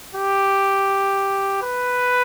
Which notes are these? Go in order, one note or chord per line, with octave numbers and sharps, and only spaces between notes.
G4
B4